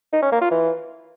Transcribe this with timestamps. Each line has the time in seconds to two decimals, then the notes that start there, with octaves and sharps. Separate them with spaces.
0.13 D#4
0.22 C#4
0.32 A#3
0.42 F4
0.51 E3